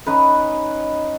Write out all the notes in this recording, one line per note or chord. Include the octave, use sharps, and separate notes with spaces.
C#4 D#4 B4